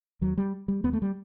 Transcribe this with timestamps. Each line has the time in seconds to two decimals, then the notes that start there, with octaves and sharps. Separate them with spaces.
0.21 D#2 F#3
0.37 G3
0.68 G3
0.83 D#2 B3
0.93 A3
1.02 G3